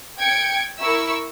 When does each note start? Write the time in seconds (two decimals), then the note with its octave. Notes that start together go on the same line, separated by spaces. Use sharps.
0.18 G5 G#6 C#7 D7
0.80 E4 A#4 C#6 E6